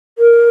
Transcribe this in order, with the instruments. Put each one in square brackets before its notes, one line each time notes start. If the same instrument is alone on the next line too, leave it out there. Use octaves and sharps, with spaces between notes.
[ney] A#4